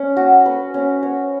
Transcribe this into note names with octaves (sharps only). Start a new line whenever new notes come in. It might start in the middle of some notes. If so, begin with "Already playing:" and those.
Already playing: C#4
F#4
B4
C#4
C#5